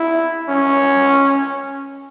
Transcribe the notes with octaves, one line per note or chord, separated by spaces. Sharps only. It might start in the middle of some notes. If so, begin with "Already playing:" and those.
Already playing: E4
C#4